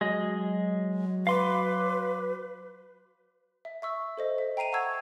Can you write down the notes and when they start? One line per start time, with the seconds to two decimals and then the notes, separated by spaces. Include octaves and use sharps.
0.01 F#3 G#3 D#5
1.27 B4 F5 C6 D6
3.65 E5
3.82 E5 C#6 E6
4.17 A4 C5 D#5
4.38 E5
4.57 G5 A#5 C7 D#7 F7
4.72 F#5 A5 A#5 C#6 E6 G#6